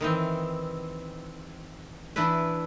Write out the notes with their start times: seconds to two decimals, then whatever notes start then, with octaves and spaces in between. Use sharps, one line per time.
0.01 D#3 E3 C4
2.16 E3 D4 E4 B4